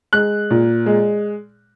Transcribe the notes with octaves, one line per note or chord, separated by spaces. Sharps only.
G#3 F#6
A#2
G#3